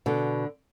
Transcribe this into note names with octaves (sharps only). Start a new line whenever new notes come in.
B2 D3